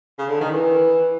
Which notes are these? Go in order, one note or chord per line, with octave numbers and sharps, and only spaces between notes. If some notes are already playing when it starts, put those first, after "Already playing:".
C#3
D3
D#3
E3